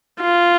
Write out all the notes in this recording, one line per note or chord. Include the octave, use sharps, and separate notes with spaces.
F4